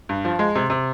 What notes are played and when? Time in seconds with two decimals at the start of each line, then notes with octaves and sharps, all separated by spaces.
0.09 G2
0.25 F3
0.39 G#3
0.56 C3
0.70 C3